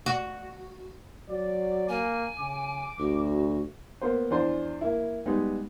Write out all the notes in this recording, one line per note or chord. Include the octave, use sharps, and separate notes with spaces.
F#4
F#3 D5
A#3 G#5
C#3 D6
D2 F#4
A#3 B3 C5
E2 D4 C5
A#3 E4
G3 G#3 B3 D#4